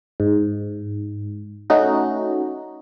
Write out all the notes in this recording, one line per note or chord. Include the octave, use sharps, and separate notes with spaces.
G#2
A3 C#4 D#4 F#4